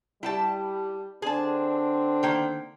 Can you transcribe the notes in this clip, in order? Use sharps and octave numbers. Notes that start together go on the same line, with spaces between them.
G3 E4 G5 A5
D3 C4 D4 G#4 A5
D#3 A#3 G5